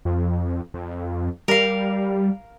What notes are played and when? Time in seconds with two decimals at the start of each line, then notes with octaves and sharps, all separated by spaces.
0.05 F2
0.74 F2
1.48 G3 A#4 F5